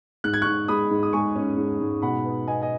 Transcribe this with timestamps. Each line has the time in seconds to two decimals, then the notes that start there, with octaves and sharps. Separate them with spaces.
0.24 G#2 F#6
0.33 G#6
0.42 C#6 F#6
0.46 G#2
0.68 G#3 B5 D#6
0.91 G#2
1.03 D#6
1.13 G#3 G#5 C#6
1.36 C#4
1.57 G#2
1.81 G#2
2.02 B2 F#5 B5
2.25 B3
2.47 B3 D#5 G#5
2.61 D#5 G#5